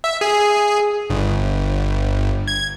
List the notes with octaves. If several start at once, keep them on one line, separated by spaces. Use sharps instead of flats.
E5
G#4
G1
G#6